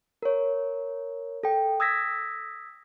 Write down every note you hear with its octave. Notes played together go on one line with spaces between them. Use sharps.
A#4 C#5
A4 G5
D#6 E6 G#6 A#6 B6